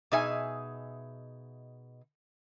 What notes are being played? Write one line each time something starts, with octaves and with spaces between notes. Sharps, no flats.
B2 D#4 G#4 E5 G#5